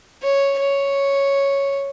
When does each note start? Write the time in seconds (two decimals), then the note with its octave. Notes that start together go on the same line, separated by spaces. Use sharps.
0.22 C#5
0.59 C#5